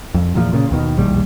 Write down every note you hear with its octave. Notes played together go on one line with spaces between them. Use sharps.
F2
E2 A#2 F3
A#2 C#3
D#2 B2 D#3
E1 A#1 D#2 G3